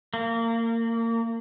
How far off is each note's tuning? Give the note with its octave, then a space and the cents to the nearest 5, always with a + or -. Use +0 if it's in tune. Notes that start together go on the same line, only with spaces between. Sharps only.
A#3 -25